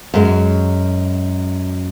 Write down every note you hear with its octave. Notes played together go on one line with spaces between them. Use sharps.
F#2 G#3